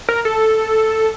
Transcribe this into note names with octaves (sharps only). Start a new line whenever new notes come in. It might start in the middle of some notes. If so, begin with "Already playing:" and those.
A#4
A4